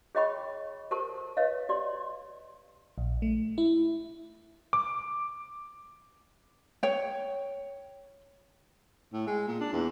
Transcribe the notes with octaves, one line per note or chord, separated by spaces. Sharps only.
G#4 C#5 D#5 G5 B5 C#6
G4 A4 A#4 C5 A5 C#6
B4 C#5 D#5 F5
G4 D5 C6
A#1
A3
E4
D6
C#5 G5
A2
G#3
A#2
D4
E2